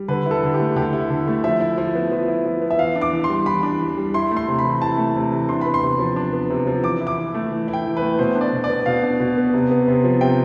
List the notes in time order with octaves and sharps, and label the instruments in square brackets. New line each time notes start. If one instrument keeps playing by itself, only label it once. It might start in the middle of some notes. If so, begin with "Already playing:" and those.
Already playing: [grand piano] G3
D3 B4
E4 A4
D3
G4
A3
D3 G4
E4
D3
A3
F3 E5
E4
F3
B3
F3
E4
F3
B3
E5
E3 F5
D4
D6
E3
C6
G3
E3 B5
D4
E3
G3
E4 C6
A3
C6
C3
B5
E3
E4 A5
A3
C3
E3
D4 C6
B3 B5
C6
C3
F3
D4
B3
C3
F3
E3 D6
E4
D6
E3
A3
E3
E4
G5
E3
B4
A3
B2 C5
D4
D5
B2
D5
B3
B2 F5
D4
B2
B3
C3
B3
C3
F3
C3 G5